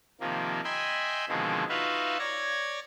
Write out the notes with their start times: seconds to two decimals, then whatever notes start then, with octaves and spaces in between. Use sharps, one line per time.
0.21 C3 D#3 F3 A#3
0.64 D#5 E5 G5 G#5 B5 C6
1.29 B2 D3 D#3 F3 G#3 C4
1.69 D#4 F4 F#4 B4 E5 F5
2.19 C#5 D5 G#6 A#6